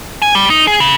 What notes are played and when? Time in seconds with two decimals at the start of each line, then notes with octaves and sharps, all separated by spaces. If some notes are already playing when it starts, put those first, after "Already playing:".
0.22 G#5
0.35 G3
0.50 D#4
0.67 G#4
0.80 C#3